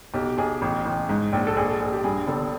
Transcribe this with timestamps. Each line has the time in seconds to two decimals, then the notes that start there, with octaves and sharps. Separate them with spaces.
0.14 B1 G4
0.38 B1 G#4
0.62 A1
0.85 A1
1.09 G#2
1.33 A#1
1.47 A4
1.57 A#1 G#4
1.69 A4
1.80 A#1 G#4
1.92 G4
2.04 G2 G#4
2.28 G1 A4